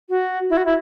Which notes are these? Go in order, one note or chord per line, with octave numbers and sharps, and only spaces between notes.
F#4
E4
F#4
E4